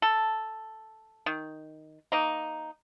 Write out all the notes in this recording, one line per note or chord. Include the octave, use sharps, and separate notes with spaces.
A4
D#3
A#3 D#4